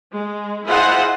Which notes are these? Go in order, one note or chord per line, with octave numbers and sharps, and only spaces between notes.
G#3
E4 F4 G#4 C5 D#5 F#5